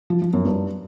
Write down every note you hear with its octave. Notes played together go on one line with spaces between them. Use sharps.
F3
F3
F#2
G2